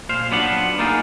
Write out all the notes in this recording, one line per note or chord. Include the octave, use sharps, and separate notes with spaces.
A#2 C5 F5
F#3 B3 D4 F4 F#5
A#3 D#4 F4 G#4